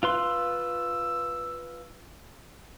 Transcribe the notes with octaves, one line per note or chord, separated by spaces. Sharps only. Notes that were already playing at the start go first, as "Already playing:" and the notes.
F4 B4 C6 E6